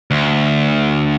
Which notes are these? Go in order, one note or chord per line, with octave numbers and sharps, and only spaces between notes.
D2